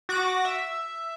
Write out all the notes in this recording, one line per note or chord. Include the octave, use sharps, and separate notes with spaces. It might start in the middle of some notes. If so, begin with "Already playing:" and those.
F#4 D6 A#6
E5